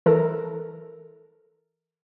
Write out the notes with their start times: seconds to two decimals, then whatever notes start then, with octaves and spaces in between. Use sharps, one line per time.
0.06 E3 A4 A#4